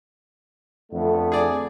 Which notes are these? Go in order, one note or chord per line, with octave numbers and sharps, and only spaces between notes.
F2 D3 A3 B3
G#4 D5